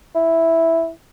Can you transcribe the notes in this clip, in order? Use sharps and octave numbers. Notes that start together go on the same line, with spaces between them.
E4